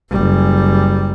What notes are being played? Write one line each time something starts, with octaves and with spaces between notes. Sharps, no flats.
F#1 G3